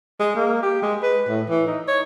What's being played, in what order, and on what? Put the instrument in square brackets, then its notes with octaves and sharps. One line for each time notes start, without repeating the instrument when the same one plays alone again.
[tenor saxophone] G#3
A#3
G4
G#3
B4
A2
E3
D#4
C#5